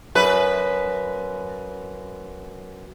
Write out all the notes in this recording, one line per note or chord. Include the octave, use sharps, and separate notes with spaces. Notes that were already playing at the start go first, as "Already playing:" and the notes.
F#2 B4